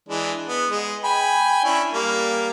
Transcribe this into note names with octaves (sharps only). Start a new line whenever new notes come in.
E3 G#3 D4
B3
G#3
G5 G#5 B5
C#4 D4 E4
G3 A#3